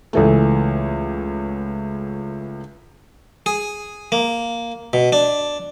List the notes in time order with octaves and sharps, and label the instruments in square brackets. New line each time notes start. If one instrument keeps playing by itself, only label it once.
[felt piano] C#2 E3 A3
[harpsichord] G#4
A#3
B2
D4